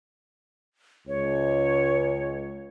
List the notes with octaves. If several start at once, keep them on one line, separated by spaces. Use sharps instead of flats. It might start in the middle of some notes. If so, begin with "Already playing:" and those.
C#2 C#5